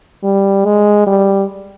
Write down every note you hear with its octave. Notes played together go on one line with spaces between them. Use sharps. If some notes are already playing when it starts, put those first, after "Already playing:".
G3
G#3
G3